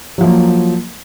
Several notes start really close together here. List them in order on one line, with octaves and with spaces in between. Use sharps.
F#3 F3 A#3